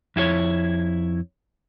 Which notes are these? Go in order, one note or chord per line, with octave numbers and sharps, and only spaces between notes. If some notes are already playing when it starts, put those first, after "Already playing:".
F2 E4 F4 C#5